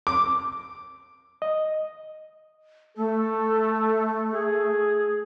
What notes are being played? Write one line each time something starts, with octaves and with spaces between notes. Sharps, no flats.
D6
D#5
A3 A4
G#4